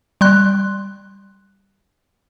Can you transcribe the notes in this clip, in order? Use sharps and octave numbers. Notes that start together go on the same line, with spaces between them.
G3 C6 F#6